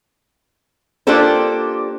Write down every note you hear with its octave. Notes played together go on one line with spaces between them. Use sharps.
A#3 D4 F4 G4 A4 C5